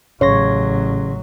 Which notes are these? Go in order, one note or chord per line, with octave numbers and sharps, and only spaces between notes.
A1 C#3 F#3 C#5 C6 A#6